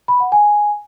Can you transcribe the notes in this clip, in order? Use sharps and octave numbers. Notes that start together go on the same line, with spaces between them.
B5
F#5
G#5